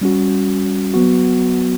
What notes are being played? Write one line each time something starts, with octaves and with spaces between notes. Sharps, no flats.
G3 C#4 F#4
F#3 B3 F#4